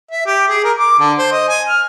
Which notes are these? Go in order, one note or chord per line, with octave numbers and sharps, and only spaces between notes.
E5
G4
G#4
A#4
D6
D3
C5
D#5
G#5
F6